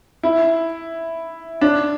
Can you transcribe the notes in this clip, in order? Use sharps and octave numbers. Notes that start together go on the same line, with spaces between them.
E4
D4